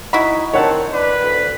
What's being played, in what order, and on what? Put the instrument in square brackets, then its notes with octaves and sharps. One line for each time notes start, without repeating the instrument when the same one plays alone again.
[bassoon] D#4 [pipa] E4 F#4 B5
[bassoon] D#3 [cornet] C4 [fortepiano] C#5 F#5 A5
[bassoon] D4 [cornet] B4
[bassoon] D2